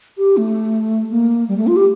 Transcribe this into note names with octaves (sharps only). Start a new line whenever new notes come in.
G4
A3
A#3
G3
A3
F4
G4